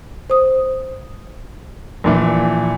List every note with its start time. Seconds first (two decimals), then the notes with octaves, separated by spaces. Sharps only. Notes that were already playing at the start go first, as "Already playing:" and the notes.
0.30 C5 D#6
2.04 A#1 A#2 E3